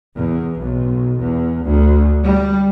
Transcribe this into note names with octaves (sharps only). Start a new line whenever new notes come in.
E2
B1
E2
D2
G3